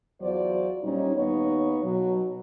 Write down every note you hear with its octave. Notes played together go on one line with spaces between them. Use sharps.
E2 F#3 F4 C5 D5
A#2 G3 C#4 D#4
D#2 B3 D#4 C#5
B2 F#3